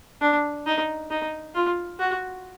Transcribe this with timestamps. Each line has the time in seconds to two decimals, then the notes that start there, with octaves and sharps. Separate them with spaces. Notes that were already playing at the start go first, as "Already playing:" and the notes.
0.21 D4
0.66 D#4
1.11 D#4
1.55 F4
2.00 F#4